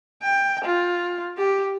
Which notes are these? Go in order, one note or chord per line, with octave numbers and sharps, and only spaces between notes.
G5
F4
G4